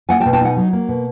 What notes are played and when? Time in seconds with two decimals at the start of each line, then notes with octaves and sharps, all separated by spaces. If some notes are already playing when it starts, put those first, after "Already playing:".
0.09 A#3 F#5 G#5
0.20 G5 A5
0.26 B2
0.33 G5 A5
0.41 D#4 F#5 G#5
0.56 F#3
0.73 A#3
0.88 B2